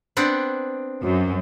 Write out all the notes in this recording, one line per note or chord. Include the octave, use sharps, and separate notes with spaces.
B3 C4 D4
F#2